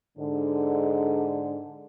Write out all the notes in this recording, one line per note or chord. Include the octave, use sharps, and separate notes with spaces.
G#2 D3